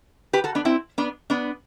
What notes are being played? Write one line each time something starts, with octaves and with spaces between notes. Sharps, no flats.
G4 B4
F#4 A4
B3 D4
C4 E4
B3 D4
B3 D4